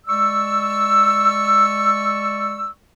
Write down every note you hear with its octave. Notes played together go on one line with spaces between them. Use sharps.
G#3 D5 C#6 E6